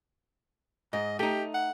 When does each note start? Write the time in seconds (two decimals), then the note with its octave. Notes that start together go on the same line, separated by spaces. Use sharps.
0.93 G#2 D#5
1.19 A3 D#4 G4
1.54 F#5